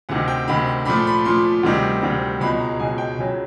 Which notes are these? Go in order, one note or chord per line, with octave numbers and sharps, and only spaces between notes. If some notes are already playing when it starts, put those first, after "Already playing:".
D2 C3 D#3 F#5
G5
D2 C3 D#3 B5
A#2 F3 A3 B5
C6
B5
A#2 F3 A3 C6
D2 C3 D#3 G3
D2 C3 D#3 G3
C#2 B2 G#3 B5
A#5
C#2 B2 G#3 G#5
G5
C#2 C#3 F#3 G#5